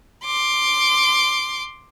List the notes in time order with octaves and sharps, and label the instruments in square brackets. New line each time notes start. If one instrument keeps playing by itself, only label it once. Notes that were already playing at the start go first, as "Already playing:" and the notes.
[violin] C6 D6